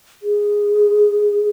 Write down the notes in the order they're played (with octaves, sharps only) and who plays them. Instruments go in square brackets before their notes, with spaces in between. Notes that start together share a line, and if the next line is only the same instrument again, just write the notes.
[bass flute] G#4